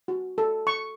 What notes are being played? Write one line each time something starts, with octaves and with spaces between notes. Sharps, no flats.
F#4
A4
C#6